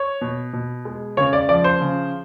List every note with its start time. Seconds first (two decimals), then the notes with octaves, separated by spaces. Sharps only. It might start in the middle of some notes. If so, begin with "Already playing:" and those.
Already playing: C#5
0.21 B2
0.53 B2
0.85 G#3
1.17 C#3 C#5
1.33 D5
1.49 F3 D5
1.64 C5
1.81 C#3